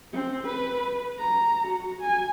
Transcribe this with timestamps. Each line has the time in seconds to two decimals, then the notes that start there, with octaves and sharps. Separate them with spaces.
0.13 C4
0.47 B4
1.19 A#5
1.67 F#4
2.01 G#5